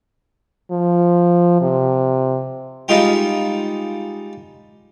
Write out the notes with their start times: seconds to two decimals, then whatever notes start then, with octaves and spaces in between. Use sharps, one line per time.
0.71 F3
1.61 C3
2.88 G3 G#3 D#4 F4 G5